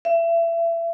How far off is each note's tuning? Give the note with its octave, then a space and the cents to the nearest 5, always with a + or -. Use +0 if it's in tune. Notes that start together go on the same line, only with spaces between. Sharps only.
E5 +30